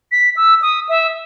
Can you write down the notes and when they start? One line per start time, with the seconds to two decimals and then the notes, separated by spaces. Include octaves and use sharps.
0.12 B6
0.37 E6
0.62 D#6
0.89 E5